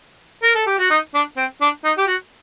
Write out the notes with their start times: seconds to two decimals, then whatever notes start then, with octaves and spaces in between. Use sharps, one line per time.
0.43 A#4
0.55 A4
0.67 G4
0.78 F#4
0.90 D#4
1.14 D4
1.37 C4
1.61 D4
1.84 D#4
1.98 G4
2.07 F#4